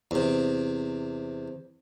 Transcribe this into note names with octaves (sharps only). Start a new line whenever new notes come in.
E2 C3